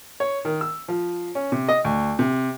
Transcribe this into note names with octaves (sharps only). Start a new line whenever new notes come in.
C#5
D#3
E6
F3
C#4
C3
D#5
D2
C3